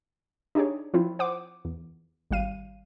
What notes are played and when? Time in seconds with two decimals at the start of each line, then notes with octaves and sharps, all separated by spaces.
0.55 D4 D#4 G4 G#4 C#5
0.94 F3 C4 E4 F4
1.19 C5 F#5 D6
1.65 E2
2.31 G#1 G3 F5 D#7